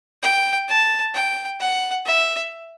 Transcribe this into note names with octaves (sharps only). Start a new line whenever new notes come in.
G5
A5
G5
F#5
E5